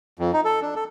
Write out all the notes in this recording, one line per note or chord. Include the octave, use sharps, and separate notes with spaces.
F2
D#4
A4
D4
A4